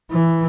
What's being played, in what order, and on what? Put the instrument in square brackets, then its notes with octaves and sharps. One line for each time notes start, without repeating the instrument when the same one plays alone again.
[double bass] E3